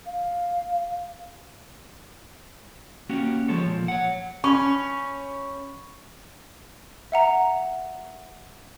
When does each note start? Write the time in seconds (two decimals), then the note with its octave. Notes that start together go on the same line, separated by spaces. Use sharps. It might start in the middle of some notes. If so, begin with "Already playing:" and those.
0.06 F5
3.10 A#3 C#4 F#4 G4
3.48 F3 G#3 A4 C#5
3.66 A#2 F3
3.88 C#5 F#5
4.44 C#4 C#5 B5 C#6
7.12 E5 F#5 A#5